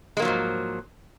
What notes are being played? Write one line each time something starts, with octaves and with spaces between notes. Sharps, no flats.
G#2 F3 F#3 G#3 A#3